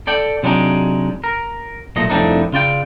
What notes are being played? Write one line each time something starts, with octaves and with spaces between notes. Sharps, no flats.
A4 D5 G5
C3 F#3 G#3 D4 D#4 G4
A#4
B1 A#2 A3 D#5
C2 F2 A2 C4 D4 D#4
C#3 F4 D5 G5